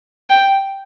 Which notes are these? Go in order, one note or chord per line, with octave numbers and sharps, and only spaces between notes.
G5